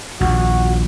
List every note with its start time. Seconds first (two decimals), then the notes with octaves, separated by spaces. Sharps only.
0.21 A#1 D#2 F#4